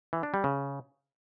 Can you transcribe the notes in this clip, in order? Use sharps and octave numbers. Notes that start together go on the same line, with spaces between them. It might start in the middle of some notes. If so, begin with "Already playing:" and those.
E3
D4
G3
C#3